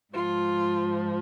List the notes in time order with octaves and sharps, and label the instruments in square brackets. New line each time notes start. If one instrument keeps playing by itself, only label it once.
[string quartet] G#2 F3 F4